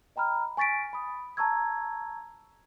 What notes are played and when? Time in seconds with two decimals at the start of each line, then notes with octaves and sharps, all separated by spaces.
0.16 D#5 G5 A#5 B5 F6
0.57 G#5 C#6 A6 B6 D7
0.93 B5 D#6
1.37 A5 A#5 C#6 E6 G#6